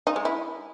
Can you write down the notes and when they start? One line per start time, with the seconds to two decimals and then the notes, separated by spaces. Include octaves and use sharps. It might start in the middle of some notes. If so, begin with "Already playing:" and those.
0.07 D#4
0.16 G#3
0.25 E4